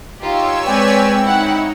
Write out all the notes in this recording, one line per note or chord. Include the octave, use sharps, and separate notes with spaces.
D#4 F4 G4 C#5 E6
G#3 C4 B4 D5 G5 G#5
D#4 E4 F#5